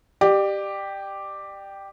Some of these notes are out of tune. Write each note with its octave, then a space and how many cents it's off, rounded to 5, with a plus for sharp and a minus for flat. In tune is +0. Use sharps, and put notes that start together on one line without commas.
G4 +0 D5 +35